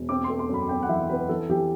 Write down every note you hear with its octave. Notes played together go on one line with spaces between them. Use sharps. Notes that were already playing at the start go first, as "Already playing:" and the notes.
Already playing: E1
C4 D6
C6
A3
C6
F#2 B5
C4 G5
F#5
E3 E5
C4 B4
E3 A4
E3 G4